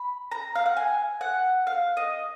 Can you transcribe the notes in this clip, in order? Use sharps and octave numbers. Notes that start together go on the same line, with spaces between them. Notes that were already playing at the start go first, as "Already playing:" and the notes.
Already playing: B5
A#5
F5
F#5
G#5
F#5
F5
D#5